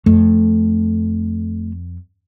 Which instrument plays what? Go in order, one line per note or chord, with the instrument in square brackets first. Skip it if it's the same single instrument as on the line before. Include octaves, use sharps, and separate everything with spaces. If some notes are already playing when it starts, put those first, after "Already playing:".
[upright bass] F2 [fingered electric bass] A3